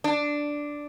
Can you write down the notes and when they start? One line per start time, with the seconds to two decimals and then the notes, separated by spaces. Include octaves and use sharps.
0.04 D4